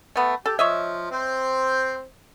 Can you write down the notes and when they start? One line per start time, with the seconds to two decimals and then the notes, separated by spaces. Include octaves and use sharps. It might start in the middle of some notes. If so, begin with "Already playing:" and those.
0.16 A3 B3
0.46 G4 A4
0.59 F3 C#5 D#5 E5
1.11 C4 C5